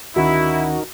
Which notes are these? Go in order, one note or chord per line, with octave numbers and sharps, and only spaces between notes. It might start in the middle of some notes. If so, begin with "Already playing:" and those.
D2 D#3 C#4 D#4 E4 F#4 A#4